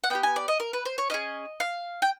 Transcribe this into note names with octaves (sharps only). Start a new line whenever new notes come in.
F#5
B3 D#4 G4 G5
G#5
D5
D#5
A#4
B4
C5
C#5
C#4 E4 G#4 D#5
F5
G5